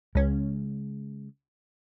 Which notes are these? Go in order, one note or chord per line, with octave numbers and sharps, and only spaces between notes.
C#2 C#3 G#3 C#4